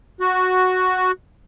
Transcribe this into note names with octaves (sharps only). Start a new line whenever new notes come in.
F#4